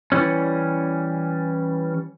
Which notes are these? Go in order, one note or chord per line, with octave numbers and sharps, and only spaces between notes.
E3 G3 C#4